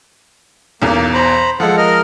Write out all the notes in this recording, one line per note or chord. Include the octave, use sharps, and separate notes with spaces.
B1 E2 A#3
C5 A#5 B5
F3 G#3 A4 F#5
A#4 D#5 F6